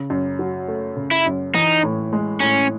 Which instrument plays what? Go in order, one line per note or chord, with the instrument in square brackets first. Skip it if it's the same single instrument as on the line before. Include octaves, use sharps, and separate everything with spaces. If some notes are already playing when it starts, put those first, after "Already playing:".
Already playing: [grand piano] C#3
F#2
F#3
A3
C#3
[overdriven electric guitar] E4
[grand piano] F#2
[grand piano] E3 [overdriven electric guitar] D#4
[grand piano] A2
G#3
[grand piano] A2 [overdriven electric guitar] C#4